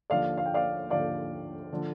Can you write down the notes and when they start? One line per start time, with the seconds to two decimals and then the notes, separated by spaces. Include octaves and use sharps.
0.10 D#2 D3 F3 D5 F5
0.38 F5
0.46 G5
0.54 D5 F5
0.90 D#2 D3 F3 D5 F5
1.72 D3 F3